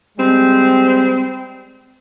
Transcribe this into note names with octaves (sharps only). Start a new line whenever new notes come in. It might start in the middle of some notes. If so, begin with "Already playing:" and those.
G3 G#3 C4